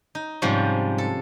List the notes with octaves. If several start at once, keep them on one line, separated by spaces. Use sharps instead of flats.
D#4
G#2 C3 F3 G3 C#4
A4